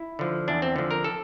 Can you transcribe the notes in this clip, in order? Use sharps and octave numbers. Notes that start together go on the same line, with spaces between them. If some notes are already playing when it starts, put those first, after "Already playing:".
Already playing: E4
D3 F3
E2 D4
C4
D3 F3
A#4
A4